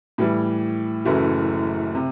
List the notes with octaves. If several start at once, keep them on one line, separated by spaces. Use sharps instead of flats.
A2 E3 G3
F#1 F#2 E3 A3 E4
C3